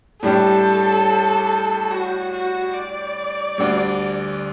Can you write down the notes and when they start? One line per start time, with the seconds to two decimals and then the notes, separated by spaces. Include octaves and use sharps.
0.23 A2 G3 D4 G4 A4
1.91 F#4
2.33 F#4
2.74 D5
3.58 D2 D3 G3